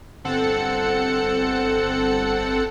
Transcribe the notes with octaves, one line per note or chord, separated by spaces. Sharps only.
G1 C4 A4 F#5 C#7